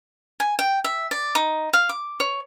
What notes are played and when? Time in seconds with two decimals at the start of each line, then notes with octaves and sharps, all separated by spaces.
0.40 G#5
0.59 G5
0.84 E5
1.11 D5
1.35 D#4
1.73 F5
1.89 D6
2.20 C#5